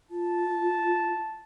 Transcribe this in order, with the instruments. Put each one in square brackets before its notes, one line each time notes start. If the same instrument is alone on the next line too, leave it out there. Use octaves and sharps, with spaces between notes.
[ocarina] F4 [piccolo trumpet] A5